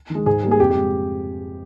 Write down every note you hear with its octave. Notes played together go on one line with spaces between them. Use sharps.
D#3
G#3
G#2 G#4
G3 A#3
G#4
F2 G4
G4
G#3